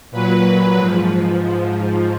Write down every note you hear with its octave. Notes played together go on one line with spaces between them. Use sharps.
A#2 F#3 B4
B4
G#2 F3